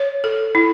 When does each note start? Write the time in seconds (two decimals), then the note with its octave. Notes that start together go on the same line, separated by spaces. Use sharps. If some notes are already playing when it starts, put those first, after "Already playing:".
Already playing: C#5
0.24 A4
0.55 E4